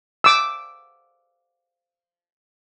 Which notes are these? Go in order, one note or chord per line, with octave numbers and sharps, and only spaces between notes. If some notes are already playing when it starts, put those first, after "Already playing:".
D6 E6